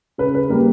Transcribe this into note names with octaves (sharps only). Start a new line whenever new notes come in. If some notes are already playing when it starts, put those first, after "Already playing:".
C#3 B4
B4
G3 A#3 A#4